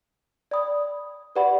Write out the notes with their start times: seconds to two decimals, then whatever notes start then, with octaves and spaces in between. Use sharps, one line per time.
0.51 D5 G5 B5 D#6
1.36 G4 B4 D5 F#5 B5